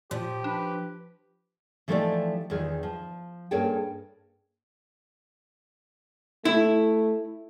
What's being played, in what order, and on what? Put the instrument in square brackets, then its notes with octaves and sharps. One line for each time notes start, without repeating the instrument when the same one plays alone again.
[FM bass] A#2 [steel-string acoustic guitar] F3 [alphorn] G4
[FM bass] D4 [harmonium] B4
[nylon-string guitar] E3 F3 A3 D#4 G4 D5
E2 D#3 F4 G#4
F3
G2 A#3 C#4 G#4 A4 G5
[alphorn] A3 [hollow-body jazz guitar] E4